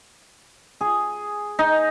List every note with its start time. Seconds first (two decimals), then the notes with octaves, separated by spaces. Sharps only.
0.81 G#4
1.59 D#4